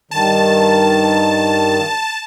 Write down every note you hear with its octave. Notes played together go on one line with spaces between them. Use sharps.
G2 D#3 A5